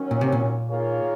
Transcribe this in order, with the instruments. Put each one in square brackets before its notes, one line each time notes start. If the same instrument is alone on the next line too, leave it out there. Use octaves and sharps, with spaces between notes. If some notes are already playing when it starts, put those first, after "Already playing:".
Already playing: [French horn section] D#3 F#3 C#4
[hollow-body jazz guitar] A#2
C3
A#2
[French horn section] D#3 A#3 F4 G#4 C#5